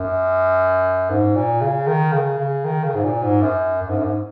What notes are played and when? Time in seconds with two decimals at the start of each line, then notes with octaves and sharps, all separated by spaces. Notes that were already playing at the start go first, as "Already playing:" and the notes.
Already playing: F#2
1.10 G#2
1.36 A#2
1.61 C#3
1.87 D#3
2.13 C#3
2.39 C#3
2.65 D#3
2.84 C#3
2.95 G#2
3.04 A#2
3.23 G#2
3.42 F#2
3.82 F#2
3.89 G#2
3.97 F#2
4.04 G#2